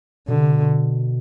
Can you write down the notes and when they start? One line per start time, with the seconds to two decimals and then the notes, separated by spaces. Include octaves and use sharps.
0.28 B2 D3
0.40 C3
0.52 B2